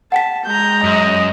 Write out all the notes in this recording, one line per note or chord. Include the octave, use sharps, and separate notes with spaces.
F#5 G5 A5 B6
G#3 A#5 G6
F#2 D#5